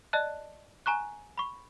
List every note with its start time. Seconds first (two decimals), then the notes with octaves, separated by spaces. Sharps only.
0.13 D5 D#5 A5 F#6
0.86 G#5 A#5 C#6 F#6
1.38 B5 C#6